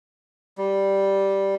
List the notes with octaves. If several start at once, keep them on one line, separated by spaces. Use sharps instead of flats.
G3